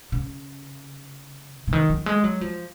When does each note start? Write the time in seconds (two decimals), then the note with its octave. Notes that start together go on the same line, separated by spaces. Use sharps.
0.12 C#3
1.68 C#3
1.73 D#3
1.89 F#3
2.06 G#3
2.24 F#3
2.41 F3